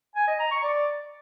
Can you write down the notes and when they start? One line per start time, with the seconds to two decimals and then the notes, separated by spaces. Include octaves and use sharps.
0.16 G#5
0.27 D#5
0.39 A#5
0.51 C#6
0.63 D5